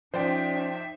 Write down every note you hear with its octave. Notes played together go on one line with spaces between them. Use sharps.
F3 C#4 D#4 C5 D5 E5 G5